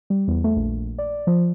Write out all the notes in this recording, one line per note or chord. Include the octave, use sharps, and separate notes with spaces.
G3
E2
A3
A#1
D5
F3